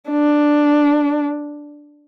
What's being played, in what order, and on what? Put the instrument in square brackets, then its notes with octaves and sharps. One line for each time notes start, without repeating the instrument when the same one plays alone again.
[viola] D4